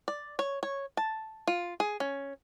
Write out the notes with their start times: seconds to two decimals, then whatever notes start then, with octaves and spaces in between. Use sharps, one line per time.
0.08 D5
0.39 C#5
0.63 C#5
0.97 A5
1.47 F4
1.80 G#4
2.00 C#4